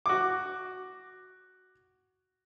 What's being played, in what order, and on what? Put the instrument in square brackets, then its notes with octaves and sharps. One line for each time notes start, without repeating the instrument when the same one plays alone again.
[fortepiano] F#4 D6